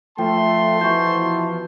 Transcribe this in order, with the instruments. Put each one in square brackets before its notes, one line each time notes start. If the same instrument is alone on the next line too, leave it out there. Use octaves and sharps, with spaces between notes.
[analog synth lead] F3 [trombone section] A3 [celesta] G5 [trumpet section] A5 C6
[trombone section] B2 E3 [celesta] C#6 G6